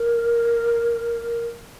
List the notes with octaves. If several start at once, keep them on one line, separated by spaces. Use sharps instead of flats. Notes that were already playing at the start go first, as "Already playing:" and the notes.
Already playing: A#4